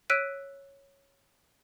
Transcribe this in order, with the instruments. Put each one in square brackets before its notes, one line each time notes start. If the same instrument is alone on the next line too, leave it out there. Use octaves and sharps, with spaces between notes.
[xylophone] C#5 E6 F#6 B6 D7 D#7